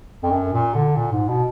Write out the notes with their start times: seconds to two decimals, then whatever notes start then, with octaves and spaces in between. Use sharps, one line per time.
0.23 F2
0.31 F#2
0.53 A#2
0.74 D3
0.96 A#2
1.12 G#2
1.28 B2